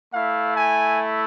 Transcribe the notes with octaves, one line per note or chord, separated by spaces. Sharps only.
A3 E4 F5
G#5